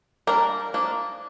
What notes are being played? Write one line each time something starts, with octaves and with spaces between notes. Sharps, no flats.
G3 A#3 D4 A#4
F3 A#3 D4